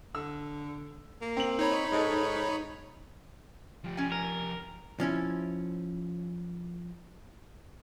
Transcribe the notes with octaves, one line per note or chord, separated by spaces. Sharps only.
D3 E6
A#3
C4 F#7
D#4 C#5 B5
G#2 A4 D#5
F3 G4
C#4 G#5
A#4
F3 C#4 E4